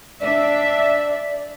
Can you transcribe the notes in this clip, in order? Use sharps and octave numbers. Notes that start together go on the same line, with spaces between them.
D4 D5 E5